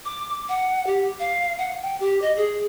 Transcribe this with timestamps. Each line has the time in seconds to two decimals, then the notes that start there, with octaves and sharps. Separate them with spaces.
0.05 D6
0.49 F#5
0.87 G4
1.20 F5
1.58 F#5
1.82 G5
2.00 G4
2.22 D#5
2.37 G#4